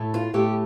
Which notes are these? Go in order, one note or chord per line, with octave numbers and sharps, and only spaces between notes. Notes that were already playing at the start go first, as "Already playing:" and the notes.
Already playing: A2 A3
F4
A2 A3 G4